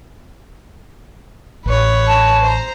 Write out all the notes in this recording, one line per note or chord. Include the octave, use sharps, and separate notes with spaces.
A1 B4 C#5
A5
C5 A#5